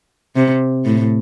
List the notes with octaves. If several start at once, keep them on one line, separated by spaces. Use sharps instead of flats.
C3
A2